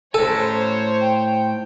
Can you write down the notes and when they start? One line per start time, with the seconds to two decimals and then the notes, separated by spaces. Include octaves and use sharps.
0.14 A2 A4 C5 C#5 G#5
1.01 G5